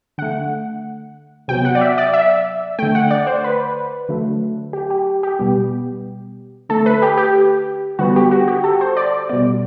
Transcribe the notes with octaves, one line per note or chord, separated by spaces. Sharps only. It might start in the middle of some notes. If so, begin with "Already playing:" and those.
D3 A3 F#5
C3 F#3 B3 G5
F#5
D5
E5
D5
E5
D3 A3 G5
F#5
D5
C5
B4
D3 F#3 A3
G4
G4
G4
B2 G3 B3
D3 A3 A4
B4
G4
G4
D3 G3 B3 F#4
G4
F#4
G4
A4
C5
D5
B2 G3 B3 D5